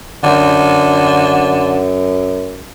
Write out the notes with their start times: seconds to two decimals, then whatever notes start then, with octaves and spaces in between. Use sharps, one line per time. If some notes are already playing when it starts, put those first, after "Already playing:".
0.23 F#2 D3